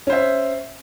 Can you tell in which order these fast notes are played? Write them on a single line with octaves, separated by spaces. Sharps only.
C#4 C5 E5